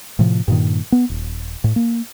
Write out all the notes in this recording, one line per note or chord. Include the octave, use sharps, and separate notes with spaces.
A2 C3 F3
G2 A#2 D#3
B3
D#1
A2
A#3